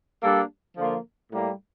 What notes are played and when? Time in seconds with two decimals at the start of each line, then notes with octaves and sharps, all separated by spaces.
0.22 G3 A#3 D4 A4
0.76 D3 F3 A#3 F4
1.30 A2 G3 A#3